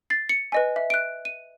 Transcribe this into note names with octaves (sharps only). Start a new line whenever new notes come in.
A6 C7
C#7
B4 D#5 G#5
E5
F#6 D7
D#7